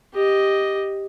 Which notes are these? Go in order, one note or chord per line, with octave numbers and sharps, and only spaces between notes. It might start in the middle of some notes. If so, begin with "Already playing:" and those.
G4 D#5